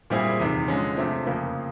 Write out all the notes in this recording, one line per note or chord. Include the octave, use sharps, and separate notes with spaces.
A#2 G3 C4 E4 G#4
E2 C3 D#3
D3 F3 G#3 C#4
C3 F3 A3 C4
F2 C#3 F3 A#3